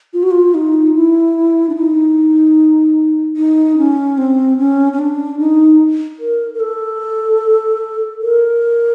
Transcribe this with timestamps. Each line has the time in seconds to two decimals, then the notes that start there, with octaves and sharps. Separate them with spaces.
0.14 F4
0.23 F#4
0.31 F4
0.54 D#4
0.95 E4
1.70 D4
1.76 D#4
3.37 D#4
3.78 C#4
4.18 C4
4.58 C#4
4.93 C#4
4.99 D4
5.39 D#4
6.20 A#4
6.54 A#4
6.60 A4
8.21 A#4